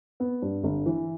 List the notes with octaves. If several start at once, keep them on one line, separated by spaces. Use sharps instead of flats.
B3
G2
G1
E3